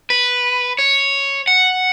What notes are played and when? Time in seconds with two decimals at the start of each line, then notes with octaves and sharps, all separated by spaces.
0.10 B4
0.79 C#5
1.47 F#5